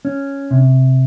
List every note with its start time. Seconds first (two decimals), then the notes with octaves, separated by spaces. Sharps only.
0.05 C#4
0.51 C3